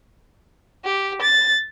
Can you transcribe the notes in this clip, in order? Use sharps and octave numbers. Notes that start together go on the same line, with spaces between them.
G4
A6